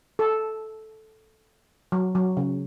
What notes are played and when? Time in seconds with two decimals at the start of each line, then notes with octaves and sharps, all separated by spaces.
0.19 A4
1.92 F#3
2.15 F#3
2.37 C#3